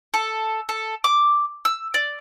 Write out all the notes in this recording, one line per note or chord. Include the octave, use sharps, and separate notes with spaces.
A4
A4
D6
E6
D5